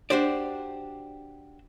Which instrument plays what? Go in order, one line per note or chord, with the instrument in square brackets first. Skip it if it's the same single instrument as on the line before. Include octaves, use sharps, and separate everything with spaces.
[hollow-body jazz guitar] D4 F#4 G4 C5 D5